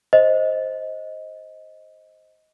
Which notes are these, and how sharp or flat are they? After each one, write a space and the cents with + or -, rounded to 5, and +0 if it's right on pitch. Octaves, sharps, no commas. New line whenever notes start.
C5 +5 D#5 +10